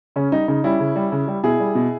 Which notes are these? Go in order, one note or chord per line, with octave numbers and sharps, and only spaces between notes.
C#3 C#4
G3 D#4
C#3 D#4
G3 C#4 E4
C#3
G3
C#3
G3
B2 E4 G#4
G3
B2